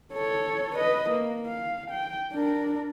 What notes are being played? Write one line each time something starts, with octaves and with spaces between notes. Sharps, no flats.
A4 C#5
B4 D#5
A#3
F5
G5
D4 A#4